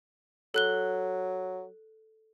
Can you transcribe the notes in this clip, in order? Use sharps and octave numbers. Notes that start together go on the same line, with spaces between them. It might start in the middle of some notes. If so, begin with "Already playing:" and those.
F#3 A4 F#6 G7